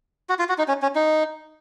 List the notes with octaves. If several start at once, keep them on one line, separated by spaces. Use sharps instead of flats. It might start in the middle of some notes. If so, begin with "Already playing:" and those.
F#4
F4
F#4
D#4
C#4
C#4
D#4